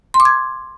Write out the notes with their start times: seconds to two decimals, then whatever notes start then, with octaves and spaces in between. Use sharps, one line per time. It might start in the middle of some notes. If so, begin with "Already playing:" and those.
0.14 C6
0.20 D6
0.25 G#6